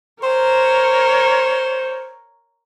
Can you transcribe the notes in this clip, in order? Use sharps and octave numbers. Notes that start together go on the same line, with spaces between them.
A#4 C5 C#5